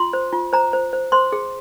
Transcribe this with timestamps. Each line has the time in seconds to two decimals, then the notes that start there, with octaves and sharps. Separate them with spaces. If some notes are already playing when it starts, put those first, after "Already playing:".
Already playing: F4 C6
0.13 C5
0.33 F4
0.53 C5 A#5
0.73 C5
0.93 C5
1.12 C5 C6
1.32 G#4